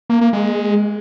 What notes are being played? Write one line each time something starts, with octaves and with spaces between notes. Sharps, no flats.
A#3
A#3
G#3